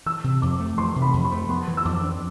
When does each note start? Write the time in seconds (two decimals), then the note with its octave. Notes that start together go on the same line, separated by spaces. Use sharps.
0.06 E3 E6
0.24 C3
0.42 F2 D6
0.60 A3
0.77 E3 C6
0.96 C3
1.02 B5
1.14 F2
1.25 C6
1.32 A3
1.49 B3 C6
1.67 E3
1.77 E6
1.85 F2 D6
2.03 D4